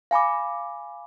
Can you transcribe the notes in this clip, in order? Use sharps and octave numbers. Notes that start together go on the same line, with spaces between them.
F5 G#5 B5 D6